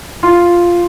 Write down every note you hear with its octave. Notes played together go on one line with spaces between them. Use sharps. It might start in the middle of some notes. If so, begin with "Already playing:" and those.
F4